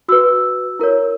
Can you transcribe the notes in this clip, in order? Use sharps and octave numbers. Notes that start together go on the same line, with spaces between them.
F#4 B4 E6
E4 A#4 C#5